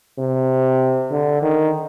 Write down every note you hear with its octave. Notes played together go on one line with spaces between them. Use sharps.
C3
D3
D#3